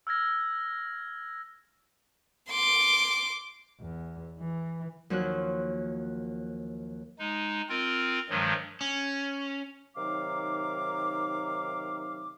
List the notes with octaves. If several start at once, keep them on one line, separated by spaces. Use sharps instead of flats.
E6 F6 G#6 A#6
C6 D6
E2
E3
D#2 F3 F#3 A#3 C#5 F#6
G#3 D#4
C4 F4 A#4
G2 D#3 F3 F#3 G#3
C#4
C3 D#3 F#3 D#4 F5 D6